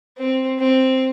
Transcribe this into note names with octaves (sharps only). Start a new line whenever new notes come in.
C4
C4